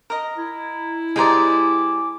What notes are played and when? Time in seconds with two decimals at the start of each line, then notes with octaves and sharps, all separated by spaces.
0.10 A#4 D#5
0.37 E4
1.16 G#3 G4 G#4 C5 D5 A#5